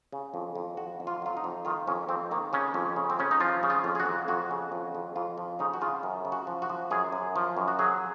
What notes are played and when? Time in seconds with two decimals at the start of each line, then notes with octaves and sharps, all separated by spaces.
0.12 C#3
0.34 F2
0.55 F2
0.77 F2 F#4
1.00 F2
1.07 F4
1.22 F#3 F4
1.37 D#4
1.44 F2
1.65 D#3 F4
1.87 F2 C#4
2.09 F2 C4
2.31 D#3 A#3
2.53 C#3 C#4
2.74 F2
2.96 C#3
3.10 C4
3.19 C#3 C#4
3.31 D#4
3.40 F3 F4
3.63 C#3
3.70 F4
3.84 F2
3.95 G#4
4.00 F#4
4.06 F2
4.28 F2 F#4
4.51 C#3
4.72 F2
4.95 F2
5.16 F2 F4
5.38 F3
5.59 C#3 D#4
5.74 F#4
5.81 C#3 F4
6.03 F#2
6.25 C#3
6.32 F#4
6.47 F3
6.62 F#4
6.69 F3
6.91 F#2 G#4
7.12 F#2
7.36 F3
7.57 F#2
7.68 F#4
7.79 F#3 G#4